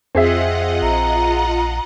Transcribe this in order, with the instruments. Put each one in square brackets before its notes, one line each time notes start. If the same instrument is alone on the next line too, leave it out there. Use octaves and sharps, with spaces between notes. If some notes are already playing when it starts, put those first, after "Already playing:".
[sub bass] F2 [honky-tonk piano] C4 G#4 E5 [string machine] F4 D#5 F#5
[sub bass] A#1 [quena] A#5